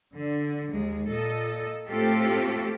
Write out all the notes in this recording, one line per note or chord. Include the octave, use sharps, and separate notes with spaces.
D3
D#2 G#3
A#2 A4 D#5
A2 A3 C4 F4 G4 A4